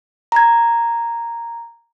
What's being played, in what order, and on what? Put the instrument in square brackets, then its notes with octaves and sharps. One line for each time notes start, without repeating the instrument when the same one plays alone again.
[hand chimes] A#5 G#6